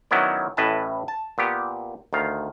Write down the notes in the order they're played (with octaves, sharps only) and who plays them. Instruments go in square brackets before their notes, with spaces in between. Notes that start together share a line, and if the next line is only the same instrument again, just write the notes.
[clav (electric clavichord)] D#3 F#3 B3 C#4 E4 D5
A1 A2 B4 D#5 G#5 A5
A5
A#2 B3 G4
D2 D#3 F5